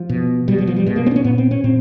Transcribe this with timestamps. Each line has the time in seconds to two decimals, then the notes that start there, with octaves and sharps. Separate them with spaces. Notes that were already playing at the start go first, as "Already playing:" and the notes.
Already playing: F3
0.09 B2
0.48 B2 G3
0.58 F#3
0.67 F3
0.77 G3
0.86 B2 G#3
0.96 A#3
1.06 C4
1.11 D4
1.16 C#4
1.24 A#2 B3
1.38 C4
1.51 C#4
1.64 A#2 C4